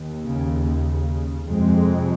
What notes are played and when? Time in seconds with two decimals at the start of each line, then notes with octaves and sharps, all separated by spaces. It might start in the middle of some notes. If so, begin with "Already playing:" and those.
Already playing: D#2
0.24 C#3
0.65 C#3
1.46 F2 C3 G#3 C4